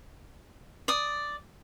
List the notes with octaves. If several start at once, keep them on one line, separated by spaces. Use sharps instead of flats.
D5 D#6